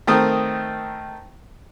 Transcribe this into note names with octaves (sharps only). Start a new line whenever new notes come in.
D#3 A3 C4 A#4 D#6